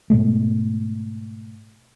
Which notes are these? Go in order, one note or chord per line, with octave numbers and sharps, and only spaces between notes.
G#2 B2 G#3 A3